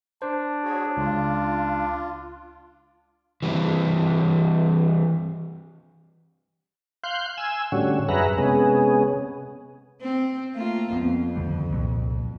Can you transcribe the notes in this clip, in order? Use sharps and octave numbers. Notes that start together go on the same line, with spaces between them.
D4 C5
F#4 G#4 C#5
C#2 F4
E3 G3 C4
F5 C6 F#6 G6
G#5 E6
A2 D3 G3 C#4 F#4
F#2 G#4 B4 E5 F#5 A#5
C3 G#3 B3 C#4 G#4
C4
A3 A#3 F4
F2 B3 C4
D#2 D3 G3
C2 A#2 F#3